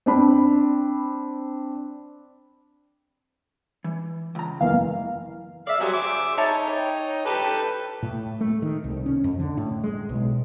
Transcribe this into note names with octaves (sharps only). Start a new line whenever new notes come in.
C4 D4 B5
E3
C#2 A#5
F#1 E3 F5
D5 E5 F5
F#3 G3 G#4 C5
E5 D6
D#4 E4 C#5 A5
C#5 G5
G4 A4 B4
A2
A3
D#3
C2
C#4
F2
D3
A2
G#3
B1